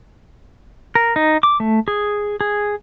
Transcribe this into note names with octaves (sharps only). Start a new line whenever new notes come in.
A#4
D#4
D6
A3
G#4
G#4